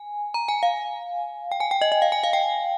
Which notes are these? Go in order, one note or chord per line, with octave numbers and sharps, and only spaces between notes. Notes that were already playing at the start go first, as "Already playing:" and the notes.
Already playing: G#5
A#5
G#5
F5
G5
G#5
G5
D#5
D#5
F5
G#5
F5
G5